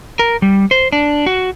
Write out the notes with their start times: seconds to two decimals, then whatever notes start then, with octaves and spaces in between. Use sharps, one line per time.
0.19 A#4
0.42 G3
0.71 C5
0.92 D4
1.26 F#4